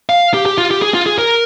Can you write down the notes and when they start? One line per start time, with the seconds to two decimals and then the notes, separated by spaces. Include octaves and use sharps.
0.09 F5
0.34 G4
0.46 G4
0.58 F4
0.71 G4
0.82 G#4
0.94 F4
1.06 G#4
1.19 A#4